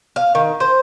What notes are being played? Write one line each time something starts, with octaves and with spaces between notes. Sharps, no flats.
F5
D#3
C5